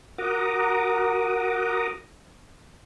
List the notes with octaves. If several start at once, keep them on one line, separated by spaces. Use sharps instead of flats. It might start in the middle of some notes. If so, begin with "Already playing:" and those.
F#4 A#4 F#5 A#5 D6 D#6